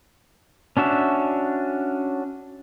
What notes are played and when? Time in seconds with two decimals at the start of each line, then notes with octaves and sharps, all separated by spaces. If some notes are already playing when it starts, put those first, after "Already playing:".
0.77 C#4 D4 F#4 E5